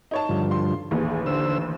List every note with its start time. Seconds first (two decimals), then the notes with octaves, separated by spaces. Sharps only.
0.11 D#4 C#5 A5
0.29 G2 D3 F3
0.51 C6
0.91 A1 D#2 A#2 G#4
1.12 G#4
1.26 D3 C5 E6